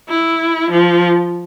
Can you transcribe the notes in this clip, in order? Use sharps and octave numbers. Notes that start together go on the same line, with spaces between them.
E4
F3